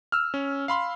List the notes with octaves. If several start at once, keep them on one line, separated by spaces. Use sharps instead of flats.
E6 F6
C#4
F5 B5 C6